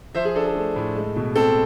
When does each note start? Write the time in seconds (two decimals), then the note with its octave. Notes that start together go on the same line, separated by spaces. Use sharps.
0.15 F3 C5 E5
0.25 G#4
0.35 D4 A4
0.45 A4
0.55 A3
0.76 A2
0.96 G#3
1.16 B2
1.35 C4 A4